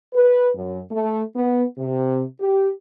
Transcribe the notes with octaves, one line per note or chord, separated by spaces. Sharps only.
B4
F#2
A3
B3
C3
G4